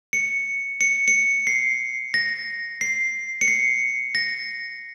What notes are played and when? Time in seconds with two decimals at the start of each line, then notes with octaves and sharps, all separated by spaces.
0.13 C#7
0.81 C#7
1.08 C#7
1.47 C7
2.14 A#6
2.81 C7
3.41 C#7
3.48 C7
4.15 A#6